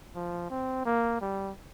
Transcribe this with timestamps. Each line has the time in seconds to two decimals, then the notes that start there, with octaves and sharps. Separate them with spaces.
0.16 F3
0.50 C4
0.85 A#3
1.21 G3